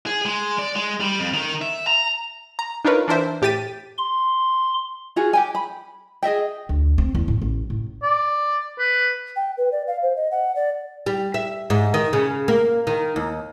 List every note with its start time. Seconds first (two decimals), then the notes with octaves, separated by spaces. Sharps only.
0.07 G#4
0.26 G#3
0.59 D5
0.75 G#3
1.01 G3
1.20 F2
1.34 D#3
1.62 E5
1.87 A#5
2.59 A#5
2.85 D4 D#4 F4 A#4 B4 C#5
3.08 E3 D4 A#4 C5 E5
3.42 A2 G4 G5 A6 B6 D#7
3.98 C6
5.16 F4 F#4 G#4
5.33 G4 G5 G#5
5.55 B5
6.23 G#4 D#5 E5 G5
6.69 D2
6.98 C4
7.15 E2
7.28 A2
7.42 A1
7.70 A2
8.03 D5
8.79 B4
9.36 G5
9.57 B4
9.72 D5
9.87 F5
10.02 C5
10.16 D#5
10.31 F#5
10.56 D5
11.06 G3
11.34 E5
11.70 G#2
11.94 D#3
12.13 C#3
12.48 A#3
12.87 D#3
13.16 D#2